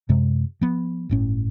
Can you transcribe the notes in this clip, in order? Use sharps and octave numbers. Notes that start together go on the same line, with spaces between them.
F#2 C3 G#3
F3 B3
G1 A2 C#4